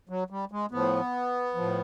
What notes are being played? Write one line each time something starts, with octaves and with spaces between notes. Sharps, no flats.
F#3
G3
G#3
A2 F3 B3
A2 F3